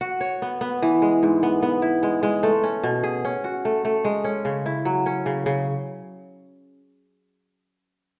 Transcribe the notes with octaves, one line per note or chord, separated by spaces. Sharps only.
F#4
C#5
B3
B3
E3
G#3
G#2
B3
B3
E4
G#3
G#3
A3
C#4
B2
G#4
C#4
F#4
A3
A3
G#3
C#4
C#3
E4
F#3
C#4
C#3
C#3